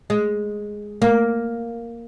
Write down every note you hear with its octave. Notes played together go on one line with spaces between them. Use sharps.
G#3
A#3